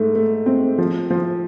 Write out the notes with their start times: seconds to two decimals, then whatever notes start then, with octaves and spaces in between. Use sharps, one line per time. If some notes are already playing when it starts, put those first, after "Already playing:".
Already playing: G#2 A3
0.15 A3
0.46 C4
0.78 F3
1.10 F3